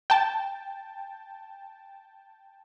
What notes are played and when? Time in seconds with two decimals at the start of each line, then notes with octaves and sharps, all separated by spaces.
0.10 G5 A5